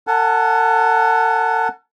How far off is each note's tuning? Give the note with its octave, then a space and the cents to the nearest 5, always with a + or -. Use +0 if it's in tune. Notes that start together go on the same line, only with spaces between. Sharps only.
A4 +45 F#5 +0 A5 -35